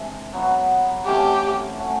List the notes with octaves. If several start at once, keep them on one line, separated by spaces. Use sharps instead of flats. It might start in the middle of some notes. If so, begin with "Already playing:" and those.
Already playing: C3 E3 G#3 D4
F#3 B3 D#4 F#4
C3 E3 A3 C#4 G4
A3 C#4 F#4